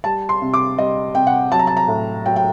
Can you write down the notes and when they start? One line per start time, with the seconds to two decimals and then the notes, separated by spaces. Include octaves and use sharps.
0.04 G3 A5
0.29 C6
0.42 C3
0.54 D6
0.78 G3 D#5
1.15 C3 G5
1.27 F#5
1.51 F#3 A5
1.59 A#5
1.67 A5
1.77 A#5
1.88 A2
2.25 F#3 G5
2.36 G5